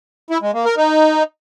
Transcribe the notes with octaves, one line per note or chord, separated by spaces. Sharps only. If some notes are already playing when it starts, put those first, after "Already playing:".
E4
G#3
A#3
A#4
D#4